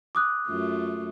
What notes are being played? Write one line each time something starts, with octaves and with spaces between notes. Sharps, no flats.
D6 D#6 F#6
F#2 A3 F4